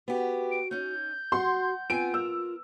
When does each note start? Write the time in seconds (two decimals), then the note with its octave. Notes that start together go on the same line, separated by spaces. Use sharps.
0.08 B3 F#4 G4
0.51 D7
0.71 C#4 D#4 G6
1.32 F#4 F#5 C6
1.90 B3 C4 F4 G#5 D7
2.14 A#4 E6